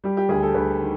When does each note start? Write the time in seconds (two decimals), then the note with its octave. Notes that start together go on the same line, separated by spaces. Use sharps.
0.04 G3 G4
0.17 G4
0.29 D2 G#4
0.43 A4
0.54 D2 B4
0.81 D#3